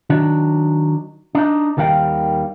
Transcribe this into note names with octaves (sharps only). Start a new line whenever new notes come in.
D#3 F#3 D4
D4 D#4
D#2 D#3 G3 F5 G5